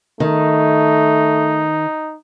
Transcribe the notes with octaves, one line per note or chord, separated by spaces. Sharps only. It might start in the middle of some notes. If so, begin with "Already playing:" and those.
D#3 A3 D#4